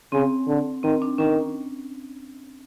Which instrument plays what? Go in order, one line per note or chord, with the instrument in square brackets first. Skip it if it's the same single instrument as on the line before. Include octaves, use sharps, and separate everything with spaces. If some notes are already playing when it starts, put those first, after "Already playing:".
[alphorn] C#3 [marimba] C4
[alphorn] D3
[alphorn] D#3 [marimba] C4
[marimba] D4
[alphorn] D#3 [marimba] C#4